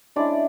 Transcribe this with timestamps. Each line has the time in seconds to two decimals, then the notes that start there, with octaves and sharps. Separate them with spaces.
0.16 G#3 C#4 D4 E4 D5